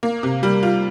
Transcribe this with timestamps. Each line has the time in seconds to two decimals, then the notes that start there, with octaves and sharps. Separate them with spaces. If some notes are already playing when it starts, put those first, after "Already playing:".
0.03 A#3
0.23 C3
0.43 G3
0.63 F4